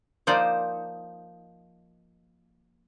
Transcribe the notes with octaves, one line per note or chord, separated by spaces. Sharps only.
F3 A#3 D#4 C5 D5